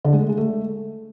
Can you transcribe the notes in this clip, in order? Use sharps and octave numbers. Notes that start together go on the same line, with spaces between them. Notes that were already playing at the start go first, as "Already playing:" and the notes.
D3
G#3
A3
G#3
A3